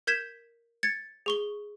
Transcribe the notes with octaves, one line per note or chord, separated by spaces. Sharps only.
A#4 G6 G#6 B6 E7
G#6 A6 C#7
G#4 C#6 G7